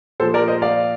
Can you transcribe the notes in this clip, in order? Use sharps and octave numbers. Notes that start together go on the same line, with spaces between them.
A#2 F3 A4 C5
A#4 D5
C5 D#5
D5 F5